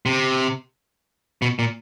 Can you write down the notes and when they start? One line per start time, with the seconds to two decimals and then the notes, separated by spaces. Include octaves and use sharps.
0.06 C3
1.42 B2
1.59 A#2